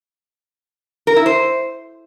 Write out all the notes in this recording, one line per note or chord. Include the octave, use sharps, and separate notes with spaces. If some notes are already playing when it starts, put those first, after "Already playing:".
A#4
E4
C5